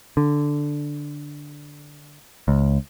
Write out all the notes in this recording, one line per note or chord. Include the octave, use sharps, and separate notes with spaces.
D3
C#2